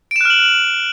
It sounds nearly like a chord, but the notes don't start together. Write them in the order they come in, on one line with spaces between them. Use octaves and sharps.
D7 E7 F#6 F6 F#7